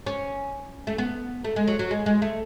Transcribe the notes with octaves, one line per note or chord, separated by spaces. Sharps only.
C#4
A3
B3
A3
G#3
F#3
F#3
G#3
G#3
A3